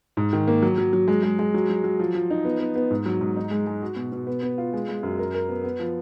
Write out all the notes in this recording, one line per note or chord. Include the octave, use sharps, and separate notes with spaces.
G#2
D#3
A#3
F#3
F#3
F#3
G#3
G#3
G#3
F#3
F#3
F#3
F3
F3
D#4
B3
B3
B3
G#2
F#3
G#2
D#4
G#3
G#3
F#4
B2
B2
B3
B3
F4
G#3
G#3
F#2
A#4
A#4
B3
B3
F3